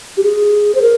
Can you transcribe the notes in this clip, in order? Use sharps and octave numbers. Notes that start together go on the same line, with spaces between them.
G4
G#4
C5
A#4